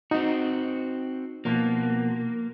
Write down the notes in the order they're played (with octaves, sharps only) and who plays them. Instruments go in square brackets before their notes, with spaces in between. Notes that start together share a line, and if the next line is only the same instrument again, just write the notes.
[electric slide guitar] C4 F#4 [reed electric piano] D#4
[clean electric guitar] B2 F3 [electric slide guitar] A#3